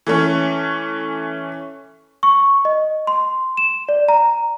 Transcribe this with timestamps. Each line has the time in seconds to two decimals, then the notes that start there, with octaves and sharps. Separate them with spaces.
0.07 E3 A3 C#4
2.23 C#6
2.65 D#5
3.07 C6
3.57 E7
3.89 D5
4.09 A#5